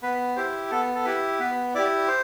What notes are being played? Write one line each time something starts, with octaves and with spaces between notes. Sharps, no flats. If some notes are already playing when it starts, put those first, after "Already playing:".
B3 B4
E4 G4 C5
B3 A4
A4
E4 G4 B4
B3 B4
E4 G4 D5
C5